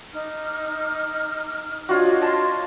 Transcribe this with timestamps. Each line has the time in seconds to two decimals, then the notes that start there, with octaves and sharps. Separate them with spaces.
0.13 D#4 D6 F6
1.89 D4 F4 F#4 C#5 D#5
2.22 A5 C6